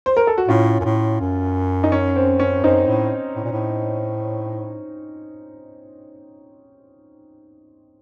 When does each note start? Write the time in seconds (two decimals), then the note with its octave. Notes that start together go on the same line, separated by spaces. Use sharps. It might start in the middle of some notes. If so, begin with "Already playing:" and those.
0.06 C5
0.17 A#4
0.27 A4
0.38 F#4
0.48 A2 C#4 F4
0.80 F#2
0.85 A2
1.20 F#2
1.84 D#4
1.92 C#4
2.16 C4
2.40 C#4
2.64 F#2 C4 D#4
2.87 A2
3.35 A2
3.44 A#2
3.52 A2